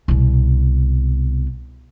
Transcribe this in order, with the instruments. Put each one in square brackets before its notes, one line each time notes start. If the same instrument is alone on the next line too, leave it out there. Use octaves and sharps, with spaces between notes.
[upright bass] C2 B2